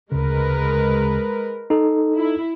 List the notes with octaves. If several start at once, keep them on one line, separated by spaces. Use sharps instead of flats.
D2 C#3 G#3 A#4 B4
D#4 A4
E4